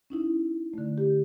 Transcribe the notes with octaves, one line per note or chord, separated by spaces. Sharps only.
C#4 D#4 E4
D3 A3
G4